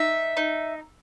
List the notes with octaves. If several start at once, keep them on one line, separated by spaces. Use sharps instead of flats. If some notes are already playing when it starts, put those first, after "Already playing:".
Already playing: D#4 E5
D#4